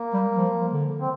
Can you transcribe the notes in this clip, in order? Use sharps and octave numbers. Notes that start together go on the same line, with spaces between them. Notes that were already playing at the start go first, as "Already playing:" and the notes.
Already playing: A#3
G3
F3
D3
C4